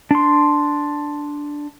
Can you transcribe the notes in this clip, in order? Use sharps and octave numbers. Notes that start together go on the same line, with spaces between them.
D4 C6